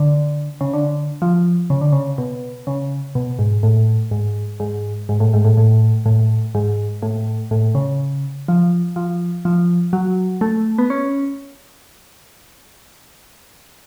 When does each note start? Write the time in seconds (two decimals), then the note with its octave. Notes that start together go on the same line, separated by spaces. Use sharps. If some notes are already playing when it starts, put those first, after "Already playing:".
Already playing: D3
0.61 C#3
0.73 D3
1.22 F3
1.70 C#3
1.81 D3
1.93 C#3
2.18 B2
2.67 C#3
3.15 B2
3.39 G#2
3.63 A2
4.11 G#2
4.60 G#2
5.09 G#2
5.20 A2
5.34 G#2
5.45 A2
5.57 A2
6.06 A2
6.55 G#2
7.02 A2
7.51 A2
7.75 C#3
8.48 F3
8.96 F3
9.45 F3
9.93 F#3
10.41 A3
10.78 B3
10.90 C#4